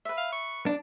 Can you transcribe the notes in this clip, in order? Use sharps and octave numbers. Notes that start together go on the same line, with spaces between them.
B4 E5
F5
C#6
D4